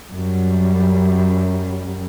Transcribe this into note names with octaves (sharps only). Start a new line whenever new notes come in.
F#2 G3